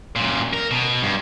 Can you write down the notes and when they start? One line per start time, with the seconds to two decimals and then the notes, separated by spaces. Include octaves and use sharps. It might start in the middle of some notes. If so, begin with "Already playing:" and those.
0.16 F#2 A#2
0.53 A#4
0.71 B2
1.03 G2